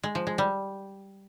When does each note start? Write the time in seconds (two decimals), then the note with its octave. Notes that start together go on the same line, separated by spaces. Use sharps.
0.03 G#3
0.15 F3
0.27 G#3
0.38 G3